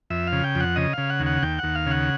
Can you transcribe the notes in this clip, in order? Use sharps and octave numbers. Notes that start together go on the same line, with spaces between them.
F2 E5
F5
C#3
G5
F2 F#5
C#3 D#5
C#3 F5
F#5
D#2
F#5
D#2 G5
D#2 F#5
F5
C#3 F#5